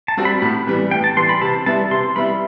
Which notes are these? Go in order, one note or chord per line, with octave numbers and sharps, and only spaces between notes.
A5
G3 C4 F#4
B5
A2 B5
E3 G3 B3 B5
A2 G5
A5
E3 G3 B3 C6
B5
C3 A5
G3 B3 E4 A5
C3 C6
G3 B3 E4 B5